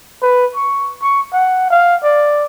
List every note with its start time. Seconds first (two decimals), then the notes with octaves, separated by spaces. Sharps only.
0.22 B4
0.55 C#6
1.02 C#6
1.33 F#5
1.70 F5
2.03 D5